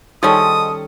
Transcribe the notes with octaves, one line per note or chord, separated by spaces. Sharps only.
D#3 F3 G3 G#3 C#4 A4 D#6